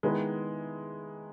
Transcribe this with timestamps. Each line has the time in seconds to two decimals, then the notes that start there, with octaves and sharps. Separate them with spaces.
0.03 D#3 G#3 B3 E4